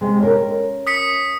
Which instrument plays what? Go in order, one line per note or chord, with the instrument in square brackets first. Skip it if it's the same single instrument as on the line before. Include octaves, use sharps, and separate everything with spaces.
[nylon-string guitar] C3 G#3
C#4 A#4
[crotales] D#6 B6 C#7